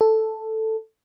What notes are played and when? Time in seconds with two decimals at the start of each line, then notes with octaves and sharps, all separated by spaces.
0.01 A4